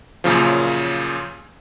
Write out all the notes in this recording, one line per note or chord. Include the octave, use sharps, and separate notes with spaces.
F#2 A#2 C#3 F3